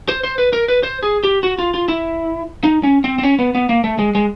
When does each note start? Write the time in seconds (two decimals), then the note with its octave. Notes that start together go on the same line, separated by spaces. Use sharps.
0.08 C5
0.23 C5
0.38 B4
0.53 A#4
0.68 B4
0.83 C5
1.03 G#4
1.24 G4
1.43 F#4
1.59 F4
1.74 F4
1.88 E4
2.64 D#4
2.83 C#4
3.04 C4
3.18 C4
3.23 C#4
3.39 B3
3.55 B3
3.69 A#3
3.84 A3
3.99 G#3
4.15 G#3